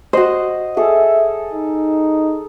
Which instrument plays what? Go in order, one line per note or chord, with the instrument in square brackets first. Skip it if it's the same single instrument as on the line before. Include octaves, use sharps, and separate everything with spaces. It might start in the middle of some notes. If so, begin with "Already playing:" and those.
[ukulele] F#4 C5 [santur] D#5
[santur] G#4 A4 [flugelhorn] E5
[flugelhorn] D#4